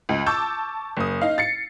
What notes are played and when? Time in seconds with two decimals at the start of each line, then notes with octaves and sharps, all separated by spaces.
0.09 C#2
0.26 A5 C#6 D6 E6 G6
0.97 F#1 D#6
1.21 D#4 F5
1.38 A6 C7 C#7